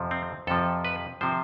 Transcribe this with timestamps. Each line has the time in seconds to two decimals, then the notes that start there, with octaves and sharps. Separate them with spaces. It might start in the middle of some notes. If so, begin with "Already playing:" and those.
Already playing: F2 C3 F3
0.11 C4
0.47 F2 C3 F3 A4
0.85 B4
1.21 C3 F3 C5